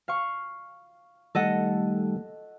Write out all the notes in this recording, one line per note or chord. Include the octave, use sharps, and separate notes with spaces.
F5 C#6
D#3 G3 A3 A4 D#5 F#5